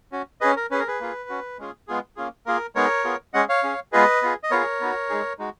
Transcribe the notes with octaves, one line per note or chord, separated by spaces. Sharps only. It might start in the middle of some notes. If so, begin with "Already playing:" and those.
C#4 F#4
C#4 G#4 B4 D#5
A#4
C#4 G#4 B4
A#4
G#4 B4
A#3 F4 G#4
C#4 F#4
G#3 C#4 F4 G#4
G#3 B3 F4 G#4
A#3 C#4 F4 G#4
A#3 F4 G#4 A#4
G#3 B3 D#4 G#4 A#4 C#5
B3 F4 G#4
G#3 C#4 G#4 D#5 F#5
C#5 F5
C#4 G#4
G#3 B3 F4 G#4 B4 D#5
B3 F4 G#4
D#5
B3 F4 G#4 A#4 C#5
B3 D#4 F#4
G#3 D#4 G#4
G#3 D#4 F#4